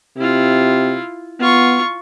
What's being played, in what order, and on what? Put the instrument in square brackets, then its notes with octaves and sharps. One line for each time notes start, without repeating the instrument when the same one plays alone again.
[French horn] C3 [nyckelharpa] E4 F4
[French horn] B3 [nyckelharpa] F4 C#6